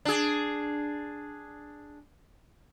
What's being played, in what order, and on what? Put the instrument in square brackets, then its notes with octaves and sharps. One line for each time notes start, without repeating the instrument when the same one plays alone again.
[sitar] D4 G#4